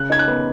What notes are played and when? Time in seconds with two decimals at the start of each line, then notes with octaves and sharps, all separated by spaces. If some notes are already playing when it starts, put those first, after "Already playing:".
Already playing: C#3 F#6
0.10 D#4 G#6
0.19 F#6
0.28 B3